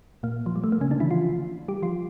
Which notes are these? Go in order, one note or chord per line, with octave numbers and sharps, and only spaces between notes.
A#2 A#3
F3
G3
A3
A#3
C#3 C#4
D3 D4
E3 E4
F3 F4
G3 G4
F3 F4